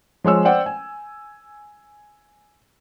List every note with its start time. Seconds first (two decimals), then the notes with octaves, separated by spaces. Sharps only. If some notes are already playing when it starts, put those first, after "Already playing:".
0.24 F3 G#3 C#5 E6
0.45 C5 D5 F#5 G5
0.66 G#5